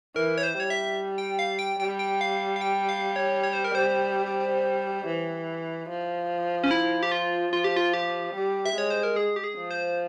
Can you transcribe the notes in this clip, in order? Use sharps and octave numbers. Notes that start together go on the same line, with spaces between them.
E3 A#4
C#5
C5
G3 C#5
E5
G5
F5
G5
G3 G5
G5
F5
F5
G5
F5
C#5
C#5
C5
A#4
C5
E3
F3
C#4
E4
G4
F4
F3 F4
G4
F4
G4
G3
E5
G#3 C#5
C5
A#4
G#4
G4
G#4
F3
C5